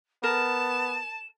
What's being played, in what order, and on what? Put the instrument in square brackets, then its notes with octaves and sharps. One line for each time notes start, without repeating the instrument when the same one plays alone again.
[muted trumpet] B3 [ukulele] A#4 [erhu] A5 [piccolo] E7